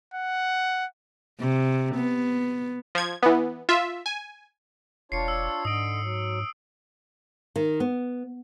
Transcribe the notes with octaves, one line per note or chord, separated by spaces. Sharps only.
F#5
C3
B3
F3 G#6
E3 B3
F4 E5
G#5
E1 D4 F4 C#5 C7 C#7
E6
G#2 D3 D#5 D#6 D7
F#3
D#3
B3